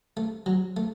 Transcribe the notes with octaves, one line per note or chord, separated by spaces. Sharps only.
A3
F#3
A3